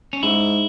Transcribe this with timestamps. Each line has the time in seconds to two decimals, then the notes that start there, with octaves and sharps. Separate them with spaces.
0.13 C#4
0.23 G#2 E4